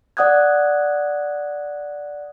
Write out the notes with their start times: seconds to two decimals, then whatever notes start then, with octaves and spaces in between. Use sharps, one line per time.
0.17 D5 F#5 D#6 F#6 G#6